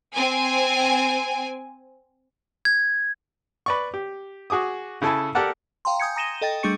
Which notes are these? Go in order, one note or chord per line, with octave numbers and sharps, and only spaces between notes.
C4 G#5
G#6
B4 D5 C#6
G4
F#4 G#4 D6 D#6
C#3 E4 A4 G#5 A5
G4 A4 A#4 D5 F#5 A5
F5 G5 A#5 C6
G#5 D#6 G6 G#6 C#7
A#5 D#6 A#6 D#7 E7 G7
A4 D#5 G5 A6
G3 A3 D4 G#4 C#6 C#7